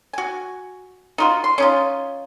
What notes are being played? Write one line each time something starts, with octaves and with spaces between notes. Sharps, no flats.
F#4 G#5
D#4 F4 F#4
C6
C#4 D#4 F4